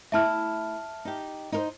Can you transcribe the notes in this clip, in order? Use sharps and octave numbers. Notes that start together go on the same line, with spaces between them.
A3 E4 E5 A5 F6
D#4 G4
D#4 A#4 C5